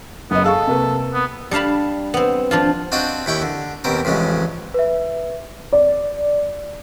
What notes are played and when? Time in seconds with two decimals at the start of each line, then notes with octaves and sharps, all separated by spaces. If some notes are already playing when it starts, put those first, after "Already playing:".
0.31 F#1 B3 D#5
0.44 G#4 A4 F5 C#6
0.67 C3 A#3 B4
1.13 B3
1.51 G3 D4 F5 A5 B5
2.14 B3 C4
2.51 F3 D4 F4
2.92 C4 D4 F#4 D#5 F5 G5
3.26 D#2 E4 G5 C#6
3.42 D3
3.84 D#2 B2 C4 A#4
4.05 A1 F2 C#3 G#3
4.74 B4 E5
5.73 D5